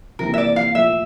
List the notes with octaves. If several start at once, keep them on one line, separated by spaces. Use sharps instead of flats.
C3 E3 A#3 A#4
E5
D5
F5
A#2 F3 A3 E5